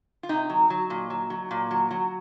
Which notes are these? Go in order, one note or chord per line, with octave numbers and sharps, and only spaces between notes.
F4
C3 D#4
F#3
F#3
A#2
F#3
F#3
A#2
F#3
F#3